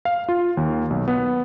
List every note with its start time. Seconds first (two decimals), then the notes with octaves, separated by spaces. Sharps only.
0.05 F5
0.29 F4
0.57 D#2
0.90 B1
1.08 B3